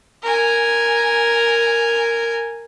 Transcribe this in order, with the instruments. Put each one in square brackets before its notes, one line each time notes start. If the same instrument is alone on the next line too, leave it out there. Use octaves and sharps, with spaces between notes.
[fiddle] A#4 G#5